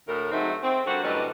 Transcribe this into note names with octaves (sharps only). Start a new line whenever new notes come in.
D2 A2 A#4
G#2 F#3 A3 C4 D#4 E5
C4
D3 G3 A#3 F#4 C5 F#5
F#2 A2 D3 G3 B4 D#5